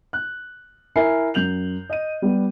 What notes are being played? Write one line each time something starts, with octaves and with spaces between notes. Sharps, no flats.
F#6
E4 A#4 E5 G#5 C7
F#2 G6 F7 F#7
D#5 D#7
G3 B3 G4